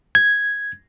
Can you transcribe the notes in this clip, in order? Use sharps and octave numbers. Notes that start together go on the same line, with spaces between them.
G#6